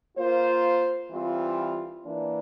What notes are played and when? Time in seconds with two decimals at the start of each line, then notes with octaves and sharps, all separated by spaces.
0.17 A#3 F4 C5
1.11 E3 G3 C4 F4
2.05 E3 A#3 D4